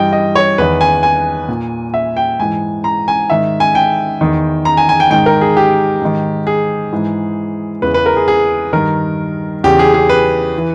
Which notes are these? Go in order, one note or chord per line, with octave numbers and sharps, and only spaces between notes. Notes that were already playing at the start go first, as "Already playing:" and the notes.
Already playing: G2 E3 D#5 G5
D#5
C#5
E2 D#3 B4
G#5
G#5
A#2
E5
G5
G#2 E3 G#5
A#5
G#5
G#2 D#3 E5
G#5
G5
E2 D#3
A#5
G#5
G#5
G5
G#2 D#3 G5
A#4
G#4
G4
G#2 D#3
G#4
G#2 E3
E2 C#3 E3 B4
B4
A#4
G#4
G#4
G2 D#3 A#4
E2 C#3 E3 G4
G#4
G#4
B4
E3